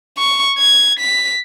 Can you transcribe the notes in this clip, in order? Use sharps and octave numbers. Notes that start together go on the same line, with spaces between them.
C#6
G#6
B6